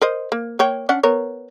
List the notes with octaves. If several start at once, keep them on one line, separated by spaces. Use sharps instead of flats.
A#4 C5 D#5
A#3
A#3 C#5 G5
C#4 D4 F#5
B3 A#4 C#5